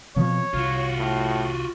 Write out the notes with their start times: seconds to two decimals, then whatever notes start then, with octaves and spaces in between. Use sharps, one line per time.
0.16 B2 F3 C4 C#5
0.54 C2 F4 F#4
0.98 A2